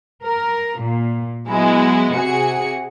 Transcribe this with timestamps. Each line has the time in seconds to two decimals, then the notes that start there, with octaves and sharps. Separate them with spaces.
0.23 A#4
0.81 A#2
1.48 F#3 G#3 B3 E4
2.15 C3 F#4 G#4 C#7